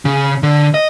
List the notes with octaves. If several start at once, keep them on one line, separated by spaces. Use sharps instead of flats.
C#3
D3
D#5